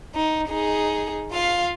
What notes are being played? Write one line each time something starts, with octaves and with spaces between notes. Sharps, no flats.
D#4
D#4 G#4
F4 F5